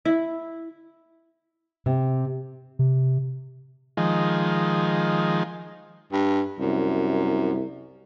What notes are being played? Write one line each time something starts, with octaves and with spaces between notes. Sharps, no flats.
E4
C3
C3
D#3 F3 G#3
G2
C2 F#2